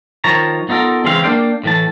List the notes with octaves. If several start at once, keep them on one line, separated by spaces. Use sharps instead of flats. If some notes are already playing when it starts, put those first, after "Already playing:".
D#3 F3 C#5 A5 A#5
B3 D#4 F4 A4 A#4
C#3 E3 G#3 C4 F5
A#3 D4 F5 G5
A2 E3 A5